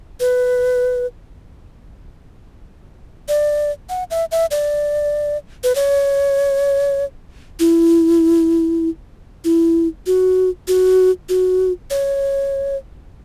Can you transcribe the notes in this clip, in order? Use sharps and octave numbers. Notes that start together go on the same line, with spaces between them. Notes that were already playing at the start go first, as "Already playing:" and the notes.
B4
D5
F#5
E5
E5
D5
B4
C#5
E4
E4
F#4
F#4
F#4
C#5